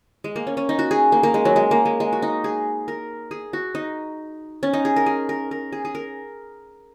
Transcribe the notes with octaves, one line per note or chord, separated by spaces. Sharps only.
G#3
A#3
C#4
C#4
D#4
F#4
G#4
A#3
A#3
G#3
F#3
G#3
A#3
G#3
G#3
F#4
D#4
G#4
A#4
G#4
F#4
D#4
C#4
D#4
G#4
A#4
G#4
A#4
A#4
G#4
G#4
A#4